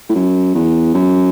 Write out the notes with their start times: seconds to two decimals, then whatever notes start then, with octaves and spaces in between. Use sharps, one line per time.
0.09 A2
0.15 F#2
0.55 E2
0.94 F#2